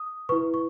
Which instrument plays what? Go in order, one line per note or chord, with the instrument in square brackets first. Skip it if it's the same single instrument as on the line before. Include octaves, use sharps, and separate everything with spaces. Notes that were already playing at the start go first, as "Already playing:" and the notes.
Already playing: [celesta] D#6
E4 B4 C#6
C#6